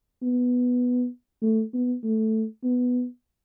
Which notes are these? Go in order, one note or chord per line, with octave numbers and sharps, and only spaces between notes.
B3
A3
B3
A3
B3